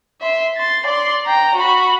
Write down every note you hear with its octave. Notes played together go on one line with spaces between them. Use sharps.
E5 C6
C6 A6
D5 C6
G5 A#5
F#4 B5